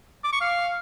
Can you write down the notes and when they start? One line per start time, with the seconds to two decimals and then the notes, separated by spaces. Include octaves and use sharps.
0.24 D6
0.32 C#6
0.41 F5